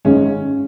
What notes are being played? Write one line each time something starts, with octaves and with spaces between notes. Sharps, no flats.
G#1 G#2 G#3 C#4